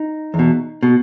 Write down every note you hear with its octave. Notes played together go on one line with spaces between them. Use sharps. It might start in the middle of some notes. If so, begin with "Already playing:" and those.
Already playing: D#4
E2
B2
B2